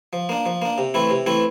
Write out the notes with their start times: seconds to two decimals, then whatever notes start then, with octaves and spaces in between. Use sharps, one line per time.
0.13 F3
0.29 A#3 D4
0.46 F3
0.62 A#3 D4
0.78 C3
0.94 E3 A3 C4 E4
1.10 C3
1.26 E3 A3 C4 E4